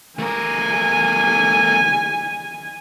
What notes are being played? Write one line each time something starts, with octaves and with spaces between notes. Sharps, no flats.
A3 A#4 G#5